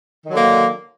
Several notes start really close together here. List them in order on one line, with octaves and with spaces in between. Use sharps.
D#3 F#3 D3 A#3